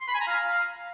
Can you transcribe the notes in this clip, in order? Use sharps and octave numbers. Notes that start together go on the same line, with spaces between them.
C6
B5
G#5
A#5
F5